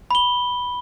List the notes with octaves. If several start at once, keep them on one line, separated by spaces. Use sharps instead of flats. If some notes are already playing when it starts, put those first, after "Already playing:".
B5 G7